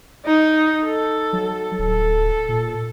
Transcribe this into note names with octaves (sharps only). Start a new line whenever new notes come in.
D#4
A4
F#3
D1 A4
A#2